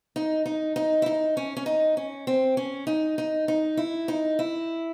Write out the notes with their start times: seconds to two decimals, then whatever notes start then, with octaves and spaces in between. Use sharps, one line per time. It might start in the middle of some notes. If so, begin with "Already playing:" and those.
0.16 D#4
0.46 D#4
0.76 D#4
1.02 E4
1.06 D#4
1.37 C#4
1.57 C#4
1.66 D#4
1.97 C#4
2.27 C4
2.57 C#4
2.87 D#4
3.18 D#4
3.48 D#4
3.77 E4
4.08 D#4
4.39 E4